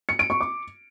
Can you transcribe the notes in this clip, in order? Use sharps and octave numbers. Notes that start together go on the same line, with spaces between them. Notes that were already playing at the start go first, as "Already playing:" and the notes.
C#7
D7
C#6
D6